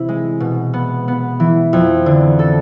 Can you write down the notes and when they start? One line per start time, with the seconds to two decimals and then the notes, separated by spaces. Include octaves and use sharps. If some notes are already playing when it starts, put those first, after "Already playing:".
Already playing: C3 E3 E4
0.09 G#3
0.40 B2
0.74 B3
1.08 B3
1.40 E3
1.73 F2
2.06 D3
2.39 A4